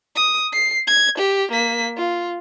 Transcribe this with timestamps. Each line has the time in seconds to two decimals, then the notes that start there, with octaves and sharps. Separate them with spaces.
0.16 D#6
0.53 C7
0.88 G#6
1.18 G4
1.52 A#3 B6
1.98 F4